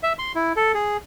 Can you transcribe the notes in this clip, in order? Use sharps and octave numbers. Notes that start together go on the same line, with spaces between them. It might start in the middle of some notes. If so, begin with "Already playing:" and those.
E5
C6
E4
A4
G#4